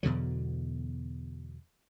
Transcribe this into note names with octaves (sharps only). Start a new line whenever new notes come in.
E2 B2 D3 F#3